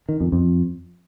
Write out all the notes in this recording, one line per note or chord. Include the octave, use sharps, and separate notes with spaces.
D#3
F2
F2